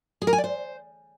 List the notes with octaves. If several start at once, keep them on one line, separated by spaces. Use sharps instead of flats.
G#4
A#4
G#5
D5
C5